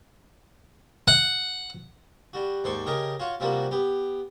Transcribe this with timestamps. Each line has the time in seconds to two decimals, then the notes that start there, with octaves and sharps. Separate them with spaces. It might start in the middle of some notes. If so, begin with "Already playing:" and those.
1.08 F#5
2.33 G3 F#4
2.64 D#2 G#2 C5 D5 C#6
2.86 C#3 G4 A#4 D#5 G#5 A5
3.20 F4 F#4 C#5
3.40 C3 F3 G3 A#3 F#4
3.71 B3 G4